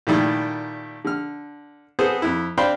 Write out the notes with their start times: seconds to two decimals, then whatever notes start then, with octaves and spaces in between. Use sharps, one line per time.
0.07 A#2 D#3 G3 A3 E4
1.04 D3 F6
1.99 B3 C4 G#4 A4 C5
2.22 F2 E4
2.57 C4 D4 F5 G5 B5 C6